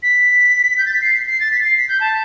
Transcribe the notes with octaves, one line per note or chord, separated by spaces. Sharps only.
B6
G6
A6
B6
C7
C7
A6
B6
C7
B6
G6
A5